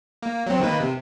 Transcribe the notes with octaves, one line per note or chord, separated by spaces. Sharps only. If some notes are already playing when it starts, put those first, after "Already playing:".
A#3
F#3 C4
D#3 A#3 B4
C3